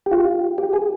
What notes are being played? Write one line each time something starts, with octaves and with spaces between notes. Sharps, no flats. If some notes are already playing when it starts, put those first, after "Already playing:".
G4
F4
G4
G#4